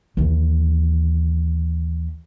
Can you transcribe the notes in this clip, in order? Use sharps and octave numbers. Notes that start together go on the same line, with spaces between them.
D#2 E3